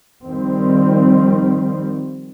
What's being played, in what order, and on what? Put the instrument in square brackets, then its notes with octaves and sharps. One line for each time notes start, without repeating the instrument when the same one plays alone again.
[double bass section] D#3 F3 G3 C4